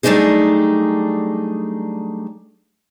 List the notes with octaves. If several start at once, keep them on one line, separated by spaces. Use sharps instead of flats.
F#3 G3 A3 D4 D#4 G#4